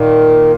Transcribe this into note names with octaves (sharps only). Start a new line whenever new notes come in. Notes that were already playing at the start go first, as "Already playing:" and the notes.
Already playing: A#2 D#3